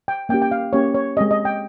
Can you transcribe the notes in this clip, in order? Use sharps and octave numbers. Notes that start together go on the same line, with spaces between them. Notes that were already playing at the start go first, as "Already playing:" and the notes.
G5
A#3 C#4 G4 G5
G5
F5
A#3 C#4 G4 C#5
C#5
G#3 C4 G4 D#5
D#5
G5